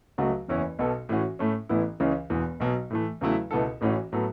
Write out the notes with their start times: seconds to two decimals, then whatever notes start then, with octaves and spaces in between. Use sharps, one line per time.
0.18 C#2 C#3 F#3 A3 F#4
0.48 F#1 E2 E3 C#4 E4
0.79 B1 B2 B3 A4
1.09 A2 E3 C#4 F#4
1.39 A2 A3 C#4
1.69 A1 A2 E3 B3 E4
2.00 C#2 C#3 E3 C#4
2.30 E1 E2 E3
2.60 B1 B2 F#3
2.90 A2 E3 A3
3.21 E2 C#3 F#3 A3 E4
3.51 C#2 B2 B3 E4 A4
3.81 A1 A2 E3 C#4 F#4
4.12 A2 F#3 B3 A4